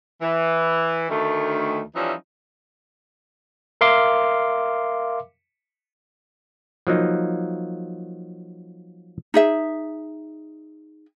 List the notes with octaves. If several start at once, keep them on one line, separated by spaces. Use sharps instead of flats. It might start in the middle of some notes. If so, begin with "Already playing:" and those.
E3
D2 D#3 A3
E3 F3 G3 C#4 D#4 E4
A#4 E5 F5 C6 D6
F3 F#3 A#3 D#4
D#4 G#4 E5